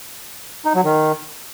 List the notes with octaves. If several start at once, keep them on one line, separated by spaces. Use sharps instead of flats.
D#4
F#3
D#3